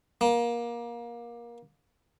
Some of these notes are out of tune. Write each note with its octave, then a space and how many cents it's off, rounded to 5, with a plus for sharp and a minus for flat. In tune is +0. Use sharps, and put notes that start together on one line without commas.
A#3 +25